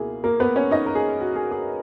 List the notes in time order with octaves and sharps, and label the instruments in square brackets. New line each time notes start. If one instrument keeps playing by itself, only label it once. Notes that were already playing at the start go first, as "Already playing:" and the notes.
Already playing: [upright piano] C#2 B2 A#3 E4 G#4
A#3 A#4
B3 B4
C#4 C#5
D#4 D#5
A#4
G#4
F#4
G#4
G#4